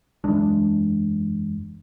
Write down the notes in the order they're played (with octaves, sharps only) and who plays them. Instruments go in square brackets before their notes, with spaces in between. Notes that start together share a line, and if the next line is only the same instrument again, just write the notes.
[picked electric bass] F#1 E2 G#3 D4